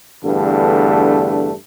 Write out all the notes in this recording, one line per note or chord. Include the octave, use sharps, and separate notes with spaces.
E2 G2 D3 A3 D4